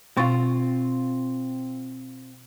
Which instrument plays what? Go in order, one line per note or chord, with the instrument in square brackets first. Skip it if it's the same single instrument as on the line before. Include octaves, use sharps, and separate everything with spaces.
[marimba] B2 C#6 A6 [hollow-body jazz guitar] C4 F4